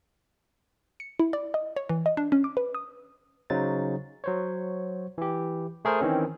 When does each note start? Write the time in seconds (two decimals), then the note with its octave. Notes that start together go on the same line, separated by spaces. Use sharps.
1.00 C#7
1.20 E4
1.33 D5
1.54 D#5
1.76 C#5
1.89 E3
2.06 D#5
2.17 D4
2.32 C#4
2.44 D6
2.57 B4
2.75 D#6
3.50 C#3 F#3 D#4 C5 A6
4.24 F#3 C5 C#5
5.18 E3 G4
5.85 A3 G#4 A#4 C5
6.01 D#3 E3 C4 C#4